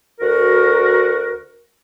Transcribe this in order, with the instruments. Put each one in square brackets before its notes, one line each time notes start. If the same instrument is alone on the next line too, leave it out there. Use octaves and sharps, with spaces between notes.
[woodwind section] D2 F#4 A#4